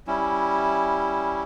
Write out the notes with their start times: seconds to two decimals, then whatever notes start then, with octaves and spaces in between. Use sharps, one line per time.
0.07 G3 C#4 E4